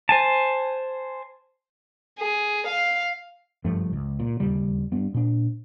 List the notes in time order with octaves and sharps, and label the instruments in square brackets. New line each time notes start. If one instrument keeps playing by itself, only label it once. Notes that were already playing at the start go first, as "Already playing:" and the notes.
[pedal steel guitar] C5 G#5 A5
[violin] G#4
F5
[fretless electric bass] F#1 G2 F3 A3
C#2
A#2
D1 D#2 C#3 G3
G2 B3
A#2 D4